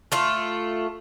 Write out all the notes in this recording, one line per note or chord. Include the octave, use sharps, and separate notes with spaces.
A3 F4